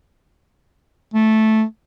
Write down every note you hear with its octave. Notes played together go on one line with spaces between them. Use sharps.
A3